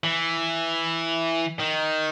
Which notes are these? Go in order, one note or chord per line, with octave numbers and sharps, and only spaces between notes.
E3
D#3